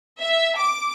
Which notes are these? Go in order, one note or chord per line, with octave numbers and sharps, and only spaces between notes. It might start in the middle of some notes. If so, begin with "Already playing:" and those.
E5
D6